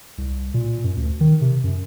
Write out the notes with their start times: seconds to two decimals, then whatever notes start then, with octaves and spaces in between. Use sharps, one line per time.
0.18 C2
0.54 A#2
0.84 F#2
0.97 D2
1.20 D#3
1.41 C3
1.64 F#2